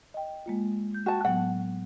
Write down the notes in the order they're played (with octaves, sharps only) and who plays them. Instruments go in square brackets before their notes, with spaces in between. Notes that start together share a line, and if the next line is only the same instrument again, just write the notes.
[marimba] D#5 G5
G#3 A#3 F4
G6
[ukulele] F#4 A5 [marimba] G5
[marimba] A2 F#3 B3 [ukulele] F#5